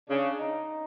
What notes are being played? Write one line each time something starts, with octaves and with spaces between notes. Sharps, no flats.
C#3 D4
D#4